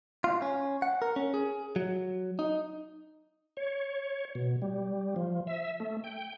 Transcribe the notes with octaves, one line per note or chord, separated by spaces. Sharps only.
F4
C#4
F#5
A#4
C#4
G#4
F#3
D#4
C#5
B2
G3
F3
E5
A3
G5